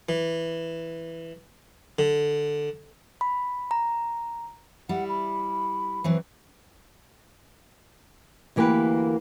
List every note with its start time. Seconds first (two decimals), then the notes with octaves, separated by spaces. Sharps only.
0.09 E3
1.99 D3
3.21 B5
3.71 A#5
4.89 G3 E4 F#5
5.09 B5
6.04 E3 F#3 C4
8.56 D2 E3 A#3 G4 A#4 B4